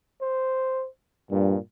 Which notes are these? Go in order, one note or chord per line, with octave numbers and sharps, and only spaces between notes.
C5
G2 A#2